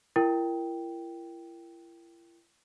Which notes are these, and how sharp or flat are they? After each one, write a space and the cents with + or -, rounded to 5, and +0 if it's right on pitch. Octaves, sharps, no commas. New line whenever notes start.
E4 +40 A#4 +0 G5 +0